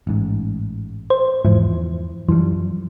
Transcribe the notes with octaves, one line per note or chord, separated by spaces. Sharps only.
A1 G#2
C5
E2 G#2 E3 F3
F#2 E3 F3 G3